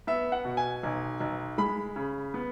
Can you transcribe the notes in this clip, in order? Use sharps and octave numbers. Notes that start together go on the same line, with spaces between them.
B3 E5
F#5
B2
G#5
B1
B1
G#3 B5
C#3
B3